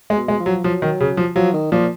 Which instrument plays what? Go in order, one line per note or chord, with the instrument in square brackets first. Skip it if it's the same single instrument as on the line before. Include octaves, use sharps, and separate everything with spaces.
[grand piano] G#3
[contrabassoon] B2
[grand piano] G#3
[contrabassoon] F3
[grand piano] F#3
[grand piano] F3 [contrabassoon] F#3
[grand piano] D#3
C#3
F3
[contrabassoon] F3 [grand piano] F#3
[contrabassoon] D#3
[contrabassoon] A#2 [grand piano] F3